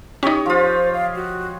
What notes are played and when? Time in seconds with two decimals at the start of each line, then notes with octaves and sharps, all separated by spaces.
0.23 C#4 D#4 G4 C#5 D#5
0.46 F3 F4 C5
0.92 F5
1.15 F#4